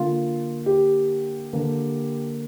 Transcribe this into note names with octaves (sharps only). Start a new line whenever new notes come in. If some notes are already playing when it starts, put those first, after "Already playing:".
Already playing: D3 A#3 F4
G4
D3 A#3